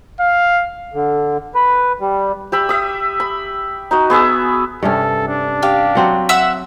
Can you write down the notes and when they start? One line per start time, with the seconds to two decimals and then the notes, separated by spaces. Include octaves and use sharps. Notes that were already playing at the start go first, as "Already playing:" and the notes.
0.20 F5
0.94 D3
1.55 B4
2.00 G3
2.52 G4 E5 B5
2.69 E5 D#6
3.20 B5
3.91 D#4 F#4 D#5
4.10 B3 G#4 E5
4.83 G2 C3 C#4 A4
5.28 D4
5.62 G4 F5
5.95 F#3 C4 F#4
6.29 E5 F#5 E6